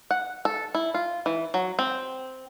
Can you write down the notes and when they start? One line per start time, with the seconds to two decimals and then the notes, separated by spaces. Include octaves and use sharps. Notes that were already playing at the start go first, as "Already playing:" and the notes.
0.11 F#5
0.45 A4
0.75 E4
0.94 F4
1.26 E3
1.54 F#3
1.79 C4